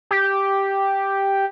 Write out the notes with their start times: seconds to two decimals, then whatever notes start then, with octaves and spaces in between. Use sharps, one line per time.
0.11 G4